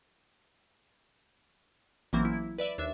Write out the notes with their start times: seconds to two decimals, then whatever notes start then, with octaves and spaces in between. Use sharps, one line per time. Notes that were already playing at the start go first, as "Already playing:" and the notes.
2.13 A1 E3 F#3 A#3 C4
2.25 E4
2.58 B4 D5 E5
2.78 D#2 D4 E5